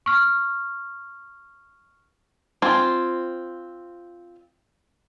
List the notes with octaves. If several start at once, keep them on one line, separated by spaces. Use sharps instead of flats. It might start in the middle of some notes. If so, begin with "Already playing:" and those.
C#6 F6
C4 F4 G#5